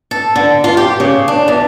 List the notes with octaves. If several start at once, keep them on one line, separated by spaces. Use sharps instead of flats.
A4
D3
F4
G4
C#3
D4
E2